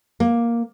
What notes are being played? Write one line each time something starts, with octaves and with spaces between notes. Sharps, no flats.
A#3